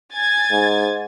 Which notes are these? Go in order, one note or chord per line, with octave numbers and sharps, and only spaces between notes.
G#5 G#6 A6
G#2